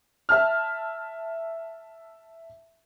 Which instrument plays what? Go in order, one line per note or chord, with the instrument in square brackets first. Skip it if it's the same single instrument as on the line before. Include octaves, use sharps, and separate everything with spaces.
[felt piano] E5 A5 F6